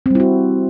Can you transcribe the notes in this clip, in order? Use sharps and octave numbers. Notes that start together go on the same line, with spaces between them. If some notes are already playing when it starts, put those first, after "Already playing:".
G3 C4 E4 F#4